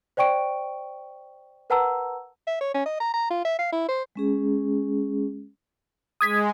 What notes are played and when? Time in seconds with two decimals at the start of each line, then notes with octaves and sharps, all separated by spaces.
0.17 C5 D5 G5 C#6 D7
1.70 A#4 B4 F#5 A5 A#5 E6
2.47 E5
2.61 C#5
2.74 C#4
2.86 D#5
3.00 A#5
3.14 A#5
3.30 F4
3.45 E5
3.59 F5
3.72 E4
3.88 C5
4.16 G#3 C#4 G#4
6.21 G#3 D#6 G#6 B6